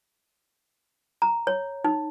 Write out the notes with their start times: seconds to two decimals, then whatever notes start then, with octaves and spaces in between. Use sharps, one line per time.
1.22 A#5
1.47 C#5
1.84 D#4